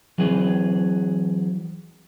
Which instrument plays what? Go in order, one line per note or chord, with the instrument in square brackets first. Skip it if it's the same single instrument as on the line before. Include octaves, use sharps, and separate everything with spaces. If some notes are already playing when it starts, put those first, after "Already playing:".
[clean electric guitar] E3 F#3 C4 G#4 B4